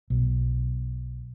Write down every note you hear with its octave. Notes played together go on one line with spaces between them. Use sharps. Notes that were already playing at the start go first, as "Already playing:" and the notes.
B1